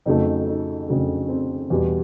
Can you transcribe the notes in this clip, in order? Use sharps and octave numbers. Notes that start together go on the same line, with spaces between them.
F2 C#3 F#3 A3 D#4
D#4
F2 C#3 F#3 A3 D4
C4
E2 B2 G3